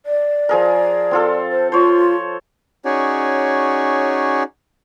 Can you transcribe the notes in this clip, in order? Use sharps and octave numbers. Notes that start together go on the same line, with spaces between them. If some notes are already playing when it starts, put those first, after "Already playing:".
D5
F3 G#4 A#4
C4 F4 A4
C5
F4 C5 C#5
C#4 D#4 F#4 G#4 C#5 D5